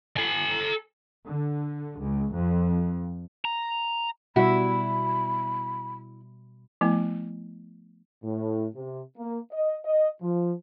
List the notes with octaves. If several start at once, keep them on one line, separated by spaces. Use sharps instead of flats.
A4 G#5
D3
C#2
F2
A#5
B2 G3 E4 F#4 E5 B5
F3 A3 B3 E4
A2
C3
A#3
D#5
D#5
F3